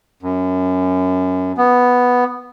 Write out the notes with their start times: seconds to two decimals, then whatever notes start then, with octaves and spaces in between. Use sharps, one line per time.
0.23 F#2
1.57 B3